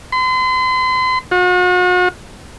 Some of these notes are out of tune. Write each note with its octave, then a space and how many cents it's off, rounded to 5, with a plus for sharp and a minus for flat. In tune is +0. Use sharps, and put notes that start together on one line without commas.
C6 -40
F#4 -40